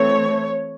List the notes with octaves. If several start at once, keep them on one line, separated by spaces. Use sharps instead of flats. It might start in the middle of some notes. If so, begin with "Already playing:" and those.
Already playing: E3 A3 C4 C#5